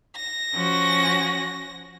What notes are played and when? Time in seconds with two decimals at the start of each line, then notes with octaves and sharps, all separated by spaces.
0.16 A#6
0.52 F3 C#4 F#4